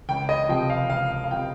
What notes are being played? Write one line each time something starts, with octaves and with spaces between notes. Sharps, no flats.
C#2 G5
D#5
C3 F3 G5
F5
C#2 F5
F5
C3 F3 G5